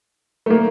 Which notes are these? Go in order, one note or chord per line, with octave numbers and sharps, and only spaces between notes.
A3
A#3